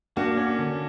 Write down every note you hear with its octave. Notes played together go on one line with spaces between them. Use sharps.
A#3 D4 F#4
C#4
D3